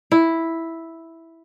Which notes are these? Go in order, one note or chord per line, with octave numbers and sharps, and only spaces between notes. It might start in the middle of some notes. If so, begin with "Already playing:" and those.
E4